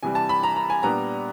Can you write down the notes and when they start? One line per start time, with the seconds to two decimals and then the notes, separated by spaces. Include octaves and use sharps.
0.03 C3 E3 G3 G#5
0.15 A5
0.29 B5
0.43 A#5
0.56 A#5
0.70 G#5
0.83 A#2 G3 B3 D4 A#5